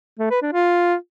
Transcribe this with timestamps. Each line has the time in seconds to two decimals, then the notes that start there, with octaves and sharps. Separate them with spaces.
0.19 A3
0.30 B4
0.42 D4
0.53 F4